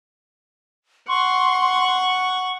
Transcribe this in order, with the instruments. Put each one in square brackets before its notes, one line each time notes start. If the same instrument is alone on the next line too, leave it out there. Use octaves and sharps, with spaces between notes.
[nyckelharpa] F#5 [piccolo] C6 [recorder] C#6